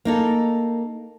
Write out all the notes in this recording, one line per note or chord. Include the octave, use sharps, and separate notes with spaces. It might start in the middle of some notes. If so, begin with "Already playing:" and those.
A#3 D#4 A4